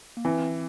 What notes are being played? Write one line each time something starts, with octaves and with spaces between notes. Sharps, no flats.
A#3
E3 C4